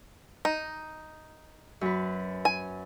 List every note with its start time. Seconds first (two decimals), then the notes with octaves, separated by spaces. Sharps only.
0.45 D#4
1.81 F#2 B4
2.45 G#5